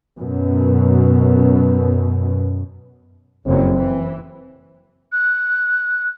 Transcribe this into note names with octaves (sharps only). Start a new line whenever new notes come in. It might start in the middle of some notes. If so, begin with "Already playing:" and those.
F#2 B2
F#1 F2 F#3 C4
E3
F#6